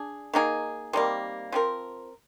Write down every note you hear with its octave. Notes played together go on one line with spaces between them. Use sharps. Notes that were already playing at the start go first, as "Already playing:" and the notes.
Already playing: D4 G#4
D#3 A#3 D#4 G#4
C3 D#3 G3 A#3
F3 C4 G4 A#4